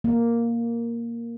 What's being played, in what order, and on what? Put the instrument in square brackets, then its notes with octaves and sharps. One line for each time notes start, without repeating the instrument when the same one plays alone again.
[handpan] A#3